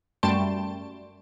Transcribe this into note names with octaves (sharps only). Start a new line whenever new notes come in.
F#2 G3 A3 A5 C6 D7